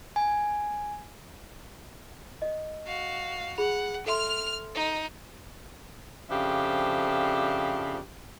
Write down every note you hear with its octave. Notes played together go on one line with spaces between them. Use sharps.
G#5
D#5
F#4 F5
G#4 F#5 B5 F7
A4 E5 C6 F6 F7
D#4
F2 C#3 F3 D4 G4 E5